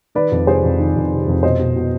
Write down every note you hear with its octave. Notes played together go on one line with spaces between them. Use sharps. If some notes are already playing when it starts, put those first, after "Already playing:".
D#3 B4 D5
F2
C3 G#4 C5
F2
D#3
F2
C3
F2
B2 C5 D#5
B2
B2